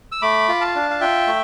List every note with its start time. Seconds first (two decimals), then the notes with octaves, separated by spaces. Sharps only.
0.12 E6
0.22 A3 B5 D6
0.49 F4
0.61 F5 A5
0.75 D4
0.90 F5
1.00 F4 E5 G5
1.27 A3